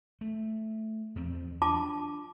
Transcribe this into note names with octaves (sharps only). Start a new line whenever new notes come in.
A3
E2 F3 C4
D4 F4 A5 D6